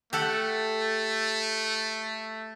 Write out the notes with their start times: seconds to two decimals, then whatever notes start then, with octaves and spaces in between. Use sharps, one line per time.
0.13 A3 G4 A4 F#5